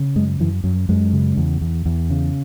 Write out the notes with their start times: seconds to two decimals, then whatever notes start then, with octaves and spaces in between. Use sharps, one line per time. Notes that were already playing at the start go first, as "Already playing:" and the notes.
Already playing: C#3
0.16 F#2 G#3
0.40 F#2 E3
0.64 F#2 F#3
0.89 F#2 G#3
1.13 C#3
1.37 E2
1.61 E2
1.86 E2
2.10 C#3